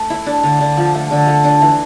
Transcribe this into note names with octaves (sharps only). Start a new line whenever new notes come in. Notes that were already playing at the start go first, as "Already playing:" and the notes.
Already playing: A3
E4
D4
D3
D3
F3
A3
D3
A3
D4
E3